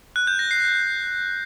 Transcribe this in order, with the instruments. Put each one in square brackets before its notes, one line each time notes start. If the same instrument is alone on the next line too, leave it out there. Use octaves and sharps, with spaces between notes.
[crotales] F#6
G6
A#6
C7